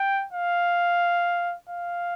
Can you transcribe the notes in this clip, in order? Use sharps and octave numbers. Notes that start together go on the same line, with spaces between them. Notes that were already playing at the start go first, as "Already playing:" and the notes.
Already playing: G5
F5
F5